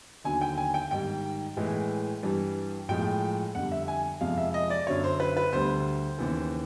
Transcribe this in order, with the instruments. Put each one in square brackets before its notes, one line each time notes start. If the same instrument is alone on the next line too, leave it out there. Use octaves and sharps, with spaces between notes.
[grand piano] D#2 D3 F#3 G#5
G5
G#5
G5
G#2 D#3 G3 G5
A2 E3 G#3
G2 E3 G3
A2 F3 G#3 G5
F2 D3 G3 F#5
E5
G#5
F2 C3 F3 G#3 F5
E5
D#5
D5
F#2 D3 F#3 C#5
C5
B4
B4
D2 D3 G3 C5
D#2 C#3 E3